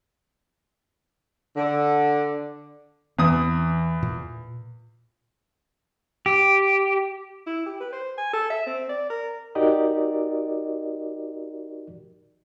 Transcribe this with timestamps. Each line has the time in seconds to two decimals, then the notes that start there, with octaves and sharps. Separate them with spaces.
1.57 D3
3.19 E2 E3 C4 D#6
4.03 A#2
6.26 G4
7.47 E4
7.66 G4
7.81 B4
7.93 C5
8.18 G#5
8.33 A4
8.50 E5
8.67 C4
8.89 D5
9.10 A#4
9.55 D#4 F#4 G4 A#4 D5 D#5